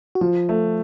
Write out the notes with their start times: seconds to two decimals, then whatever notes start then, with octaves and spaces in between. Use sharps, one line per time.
0.15 F#4
0.21 F3 F4
0.49 A3